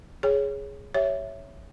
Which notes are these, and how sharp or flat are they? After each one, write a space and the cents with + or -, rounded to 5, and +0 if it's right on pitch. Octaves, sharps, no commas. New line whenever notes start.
G#4 +0 C#5 +0
G4 +0 C#5 +0 E5 +0